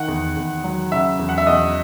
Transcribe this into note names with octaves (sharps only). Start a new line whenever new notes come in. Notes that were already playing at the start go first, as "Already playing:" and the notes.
Already playing: D#3 F#5
E2
E2
F#3
C#3 E5
E2
F#5
E5
E2 D#5